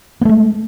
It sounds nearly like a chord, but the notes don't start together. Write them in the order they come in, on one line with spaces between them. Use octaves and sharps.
B3 A3 G#3